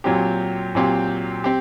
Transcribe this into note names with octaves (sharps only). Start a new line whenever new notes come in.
A#2 F#3 C4 G4
A#2 F#3 C4 G4
C4 G4